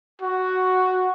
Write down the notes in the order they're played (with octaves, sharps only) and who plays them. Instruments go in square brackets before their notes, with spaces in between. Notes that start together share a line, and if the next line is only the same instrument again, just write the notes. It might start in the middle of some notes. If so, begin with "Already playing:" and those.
[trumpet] F#4